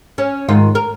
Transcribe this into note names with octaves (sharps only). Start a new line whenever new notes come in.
C#4
G#2 D#3 F4
A#4